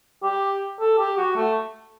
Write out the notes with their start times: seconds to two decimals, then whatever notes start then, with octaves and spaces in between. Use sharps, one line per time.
0.23 G4
0.80 A4
0.98 G4
1.17 F#4
1.36 A3